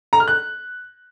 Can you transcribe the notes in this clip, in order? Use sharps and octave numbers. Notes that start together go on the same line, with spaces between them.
A#5
F6
F#6